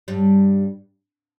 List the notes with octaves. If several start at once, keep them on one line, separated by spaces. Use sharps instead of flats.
G2 G3